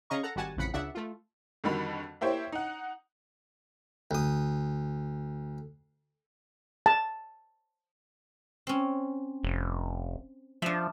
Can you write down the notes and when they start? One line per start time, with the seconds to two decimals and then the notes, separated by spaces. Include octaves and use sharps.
0.10 C#3 C#4 D#5 F5 A#5 C#6
0.23 A4 F#5 A#5
0.36 G#1 G3 F#4 F#5 G#5 A5
0.57 A1 F2 C#3 F#5 B5 C#7
0.74 C#2 C#3 D4 E5 F#5
0.95 A3 F4
1.64 F2 D3 D#3 G3 F#4 B5
2.21 A#3 E4 G4 C5 C#5
2.52 D#4 F#5
4.11 D2 D#6
6.86 A5
8.67 C4 C#4
9.43 F1
10.62 F3 D4 E5